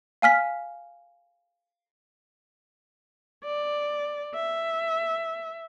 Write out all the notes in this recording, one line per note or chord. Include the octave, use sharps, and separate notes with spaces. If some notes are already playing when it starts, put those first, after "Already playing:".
F5 G#5 F6 B6
D5
E5